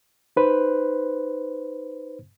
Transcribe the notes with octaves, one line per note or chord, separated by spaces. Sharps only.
D#4 B4 C5